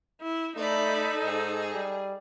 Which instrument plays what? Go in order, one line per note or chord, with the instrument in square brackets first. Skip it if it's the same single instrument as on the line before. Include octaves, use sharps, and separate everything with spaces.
[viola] E4
[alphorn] A3 [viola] D#4 A4 [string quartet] D5 B5
[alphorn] G#2 [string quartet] G#4
[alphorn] G3